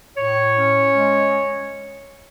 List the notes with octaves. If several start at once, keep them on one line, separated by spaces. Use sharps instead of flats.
A2 C#5
C#4
G#3